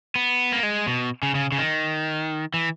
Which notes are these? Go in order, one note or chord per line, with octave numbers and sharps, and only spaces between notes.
B3
A#3
G#3
B2
C#3
C#3
C#3
D#3
E3